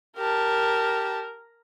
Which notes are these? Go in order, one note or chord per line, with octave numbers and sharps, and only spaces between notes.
G4 A#4 A5